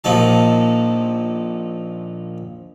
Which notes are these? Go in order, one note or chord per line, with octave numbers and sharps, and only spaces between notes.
A#1 A#2 F3 D#4 A5